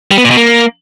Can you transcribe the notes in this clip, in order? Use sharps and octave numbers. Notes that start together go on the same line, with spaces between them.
G3
B3
A#2
B2
A#3